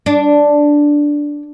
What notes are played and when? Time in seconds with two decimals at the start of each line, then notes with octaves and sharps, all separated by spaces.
0.06 D4